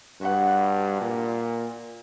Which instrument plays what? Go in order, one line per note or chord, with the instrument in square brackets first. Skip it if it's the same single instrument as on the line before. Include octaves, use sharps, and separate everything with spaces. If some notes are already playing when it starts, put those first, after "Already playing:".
[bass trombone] G2 [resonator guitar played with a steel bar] F#4 B4 F#5
[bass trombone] A#2